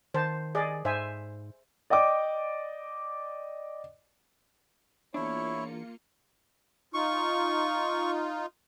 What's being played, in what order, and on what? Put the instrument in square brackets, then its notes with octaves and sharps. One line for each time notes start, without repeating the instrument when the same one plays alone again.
[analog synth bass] D#3 [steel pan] C5 A5
[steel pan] G#4 D5 D#5
[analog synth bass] G#2 [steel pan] C5 E5 G#5
[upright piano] D5 D#5 G5 D6
[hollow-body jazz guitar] E2 D4 [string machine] A#3 F4 C#7 [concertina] E4 [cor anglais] C#5
[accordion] D#4 F4 [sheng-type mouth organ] C#6